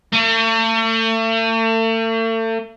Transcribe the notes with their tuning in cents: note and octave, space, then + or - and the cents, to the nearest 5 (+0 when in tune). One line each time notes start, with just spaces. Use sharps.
A3 +40